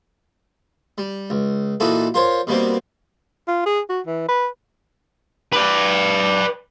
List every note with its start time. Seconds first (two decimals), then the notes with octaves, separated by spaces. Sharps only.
0.98 G3
1.30 C#2
1.80 A#2 E3 D#4 F#4 A4
2.14 F4 A#4 C5 C#5
2.47 B2 G3 A#3 C4
3.48 F4
3.66 G#4
3.90 F#4
4.07 E3
4.29 B4
5.53 B4 D5